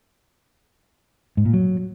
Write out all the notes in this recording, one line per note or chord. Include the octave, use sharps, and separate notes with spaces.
G#2
A#2
F#3